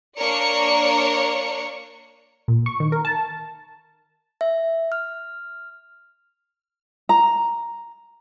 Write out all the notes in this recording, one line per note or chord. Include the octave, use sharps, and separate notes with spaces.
A#3 D4 A#4 C#5 D5 C#7
A#2
C#6
D#3
A#4
A5
E5
F6
A#5